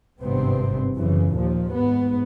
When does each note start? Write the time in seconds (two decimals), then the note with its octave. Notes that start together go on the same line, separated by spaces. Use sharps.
0.22 G#1 G2 C3 B3 C4
0.96 F#2 C#3 E3
1.35 D#2 A#2 F3
1.72 G#2 B3